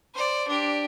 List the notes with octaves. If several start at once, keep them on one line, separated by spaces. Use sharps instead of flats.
C5 D5
D4 G4